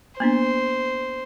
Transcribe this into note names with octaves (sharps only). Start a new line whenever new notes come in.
A#3 B3 D4 C5